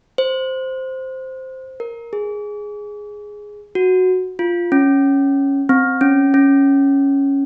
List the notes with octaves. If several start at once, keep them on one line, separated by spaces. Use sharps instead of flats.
C5
A#4
G#4
F#4
F4
C#4
C4
C#4
C#4